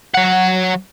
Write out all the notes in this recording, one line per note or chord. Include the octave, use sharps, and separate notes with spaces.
F#3 F#5